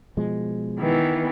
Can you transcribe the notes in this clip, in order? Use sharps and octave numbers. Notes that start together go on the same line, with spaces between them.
B2 F3 G#3
D#3 E3 B3